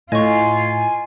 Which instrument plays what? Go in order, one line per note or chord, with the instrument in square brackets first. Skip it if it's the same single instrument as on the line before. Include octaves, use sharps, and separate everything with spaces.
[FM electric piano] A2 [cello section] F4 [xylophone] D#5 C#6 [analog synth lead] G#5